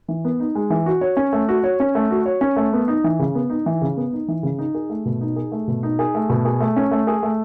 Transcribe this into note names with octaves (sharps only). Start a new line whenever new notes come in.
E3
B3
D#4
G#3
E3
F#4
C#5
C#4
A3
F#4
C#5
C#4
A3
F#4
C#5
C#4
A3
B3
D#4
E3
C#3
B3
D#4
E3
C#3
B3
D#4
E3
C#3
D#4
G#4
A3
B2
D#4
G#4
A3
B2
D#4
G#4
A3
B2
G#4
A3
C#4
A3
G#4
A3